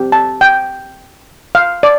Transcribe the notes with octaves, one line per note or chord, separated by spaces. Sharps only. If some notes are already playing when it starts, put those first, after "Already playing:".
Already playing: C4 G4
A5
G5
F5
D5